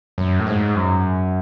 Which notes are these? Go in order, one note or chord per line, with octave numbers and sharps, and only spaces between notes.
F#2
A2
G#2
F#2